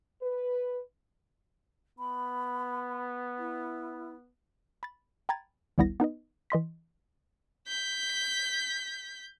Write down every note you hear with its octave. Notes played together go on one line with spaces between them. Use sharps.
B4
B3 B5
E4
B5 A6
G5 G#5 A#5 B5 G#6 A6
G#1 D2 G3 B3 E4 A#6
B3 D#4 B4 D#5
E3 D#5 C6 B6
G6 B6